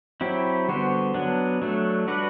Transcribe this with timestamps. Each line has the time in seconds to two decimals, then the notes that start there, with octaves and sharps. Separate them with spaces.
0.21 F#3 C4 E4 G4
0.68 D3 G3 B3 F#4 C5
1.14 F#3 B3 D4
1.62 F#3 A3 D4
2.08 G3 D4 F#4 B4 D5